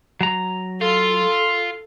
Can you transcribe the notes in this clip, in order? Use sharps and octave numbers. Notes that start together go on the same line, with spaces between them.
F#3 A#5
F4 A4